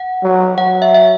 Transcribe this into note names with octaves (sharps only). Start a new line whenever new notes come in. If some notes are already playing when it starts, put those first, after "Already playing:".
Already playing: F#5
F#3
F#3 F#5
E5
E5